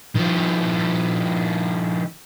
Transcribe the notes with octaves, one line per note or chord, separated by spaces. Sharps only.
D#3 F3